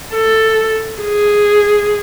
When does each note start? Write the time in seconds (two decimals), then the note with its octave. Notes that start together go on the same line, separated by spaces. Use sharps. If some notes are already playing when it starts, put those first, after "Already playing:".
0.13 A4
1.01 G#4